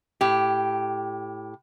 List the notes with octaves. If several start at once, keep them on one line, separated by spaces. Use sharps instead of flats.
A2 G4